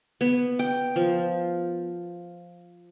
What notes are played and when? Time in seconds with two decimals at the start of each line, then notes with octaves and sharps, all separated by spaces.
0.21 B3
0.59 G5
0.96 F3